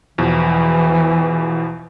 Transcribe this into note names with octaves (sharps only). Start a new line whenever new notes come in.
E2 B2 E3 F3